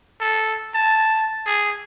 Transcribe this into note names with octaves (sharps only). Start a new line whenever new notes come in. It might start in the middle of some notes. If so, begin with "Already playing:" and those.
A4
A5
G#4